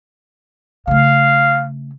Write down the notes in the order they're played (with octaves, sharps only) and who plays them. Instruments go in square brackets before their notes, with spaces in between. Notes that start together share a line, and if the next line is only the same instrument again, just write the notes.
[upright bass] C#3 A3 [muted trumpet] F5